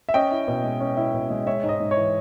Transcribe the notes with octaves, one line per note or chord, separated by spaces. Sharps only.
E5
C#4 D#5 G5
E4
B2
G#3
C#4
E4
B2
G#3
G#3 C#5 E5
G#2
D#5
G#2
C#5
E3